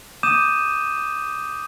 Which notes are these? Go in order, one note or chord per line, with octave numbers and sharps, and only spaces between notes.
D6 D#6 G6 D#7 E7